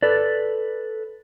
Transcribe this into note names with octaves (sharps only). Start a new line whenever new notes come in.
A4 B4 D5